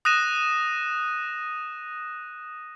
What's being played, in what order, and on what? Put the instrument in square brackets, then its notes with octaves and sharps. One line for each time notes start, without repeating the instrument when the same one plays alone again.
[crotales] D#6 F#6 A#6 D#7 E7